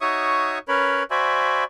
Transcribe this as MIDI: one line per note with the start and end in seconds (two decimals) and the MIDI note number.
0.01 0.59 63
0.01 0.59 66
0.01 0.59 73
0.01 0.59 76
0.01 0.59 85
0.01 0.59 87
0.68 1.03 61
0.68 1.03 70
0.68 1.03 71
0.68 1.03 73
0.68 1.03 83
1.11 1.64 66
1.11 1.64 72
1.11 1.64 74
1.11 1.64 76
1.11 1.64 80
1.11 1.64 83